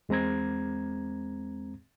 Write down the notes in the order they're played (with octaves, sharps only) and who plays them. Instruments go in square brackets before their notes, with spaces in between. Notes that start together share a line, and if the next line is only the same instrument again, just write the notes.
[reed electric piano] E2 G#3 C4 A#5 G#6